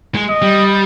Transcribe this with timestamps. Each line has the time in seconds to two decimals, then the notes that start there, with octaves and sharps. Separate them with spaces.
0.15 G#3
0.29 D#5
0.42 G3